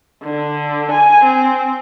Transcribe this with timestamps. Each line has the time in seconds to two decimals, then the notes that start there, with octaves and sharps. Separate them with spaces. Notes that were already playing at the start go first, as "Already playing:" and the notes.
0.23 D3
0.91 G#5
1.24 C4